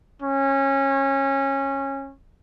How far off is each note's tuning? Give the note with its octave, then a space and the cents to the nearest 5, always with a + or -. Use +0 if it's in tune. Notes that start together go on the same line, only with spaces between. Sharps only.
C#4 -20